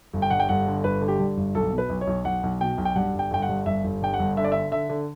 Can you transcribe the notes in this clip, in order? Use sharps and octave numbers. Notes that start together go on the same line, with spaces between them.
G1
G5
G2 F#5
G5
G1 F#5
D3
G1 B4
D3
G4
G2
G1
B1 A4
B2
B4
B1
C#5
B1
B1 F#5
B1
B2 G5
B1
G5
G2 F#5
G1
G5
G1 G5
F#5
G2
G1 E5
G1
G2 G5
F#5
G1
D3 E5
D5
D3 E5
D3 E5
D3